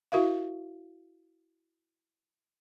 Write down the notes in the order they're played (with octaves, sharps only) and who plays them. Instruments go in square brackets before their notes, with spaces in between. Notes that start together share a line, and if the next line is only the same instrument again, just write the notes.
[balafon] E4 F#4 A#4 E5 F5